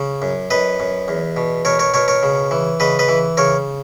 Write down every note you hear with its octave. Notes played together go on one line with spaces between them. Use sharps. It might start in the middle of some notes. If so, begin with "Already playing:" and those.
Already playing: C#3
F#2
F#2 B4 D#5
F#2
E2
B2
B2 A#4 C#5
A#4 C#5
B2 A#4 C#5
A#4 C#5
C#3
E3
C#3 B4 D#5
B4 D#5
E3
C#3 A#4 C#5